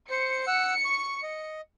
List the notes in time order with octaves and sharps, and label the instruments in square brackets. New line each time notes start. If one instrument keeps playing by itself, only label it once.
[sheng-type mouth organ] C5 [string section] C#7
[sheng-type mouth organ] F#5 E6
C#6
D#5